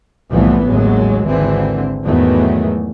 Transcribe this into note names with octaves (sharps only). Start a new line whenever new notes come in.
C2 A2 E3 F3 A3 B3
A1 D#2 A2 F#3 G#3
G#1 D3 E3 C4
E2 G#2 D#3 E3 F#3 A3